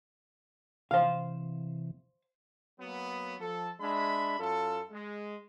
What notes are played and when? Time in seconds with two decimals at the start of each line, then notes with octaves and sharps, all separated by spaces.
0.91 C3 E3 C5 F5
2.80 F#3 A#3 B3
3.40 F3 A4
3.80 G#3 D4 E5 B5
4.39 F#2 F4 A4
4.91 G#3